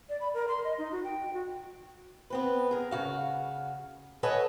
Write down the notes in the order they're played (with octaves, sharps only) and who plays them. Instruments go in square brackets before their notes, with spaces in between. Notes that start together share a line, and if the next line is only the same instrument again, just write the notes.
[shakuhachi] D5
B5
A#4
C6
D#5
D#4
F#4
G5
F#4
[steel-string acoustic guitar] B3 C4 B4
G#4 A#4
C#3 F#4 F5
A4 B4 C#5 D#5 F#5 G#5